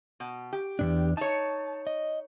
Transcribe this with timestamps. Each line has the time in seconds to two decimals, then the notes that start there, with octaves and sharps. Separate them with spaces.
0.20 B2
0.53 G4
0.79 E2 G2 D4
1.17 D#4 C#5 A5
1.87 D#5